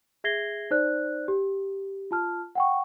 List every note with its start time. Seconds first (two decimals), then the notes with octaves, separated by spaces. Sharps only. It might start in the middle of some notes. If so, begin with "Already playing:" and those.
0.24 G#4 E5 G#6 A#6 C7 G7
0.71 D#4 C5 D5 F#6
1.28 G4
2.11 F4 A5 F6
2.55 F#5 G5 C#6